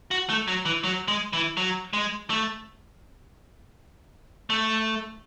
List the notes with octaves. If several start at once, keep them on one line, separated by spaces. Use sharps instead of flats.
F#4
A3
F#3
E3
F#3
G#3
E3
F#3
G#3
A3
A3